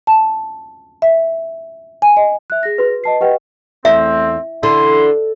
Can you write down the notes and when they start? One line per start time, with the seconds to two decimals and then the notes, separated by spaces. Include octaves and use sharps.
0.07 A5
1.02 E5
2.02 G#5
2.17 D#5
2.50 E5 F#6
2.63 G#4 A#6
2.78 F#4 B4
3.04 D#5 A5 C7
3.21 G4 B4 D#5 F#5 G5
3.85 E2 A3 C4 E5
4.63 D3 E4 C6